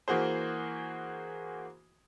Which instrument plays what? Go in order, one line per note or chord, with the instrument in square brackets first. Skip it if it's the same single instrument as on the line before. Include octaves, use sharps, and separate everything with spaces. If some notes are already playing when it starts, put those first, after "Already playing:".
[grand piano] E3 A#3 F#4 G#4 C5